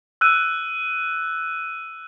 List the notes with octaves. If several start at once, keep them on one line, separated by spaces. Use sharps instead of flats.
E6 F#6 D#7